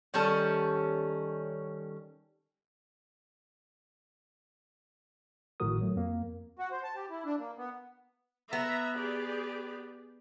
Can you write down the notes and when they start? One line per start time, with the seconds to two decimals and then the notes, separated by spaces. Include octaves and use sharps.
0.14 D#3 G3 C#4 A4
5.60 G#1 A2 F3 F#4 A#4 D#6
5.81 F#3 A3
5.95 F2 A#3
6.59 F#4
6.71 C5
6.84 A5
6.95 G4
7.10 E4
7.25 D4
7.39 A#3
7.58 B3
8.53 B3 E5 A#5
8.96 G4 G#4 D5